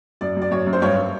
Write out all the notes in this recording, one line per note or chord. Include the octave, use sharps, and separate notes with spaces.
F#2 D5
F#2
D5
F#2 C#5
F#2
C5
G2 C#5